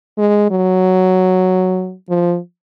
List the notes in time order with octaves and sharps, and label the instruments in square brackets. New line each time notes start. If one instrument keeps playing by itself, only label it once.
[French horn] G#3
F#3
F3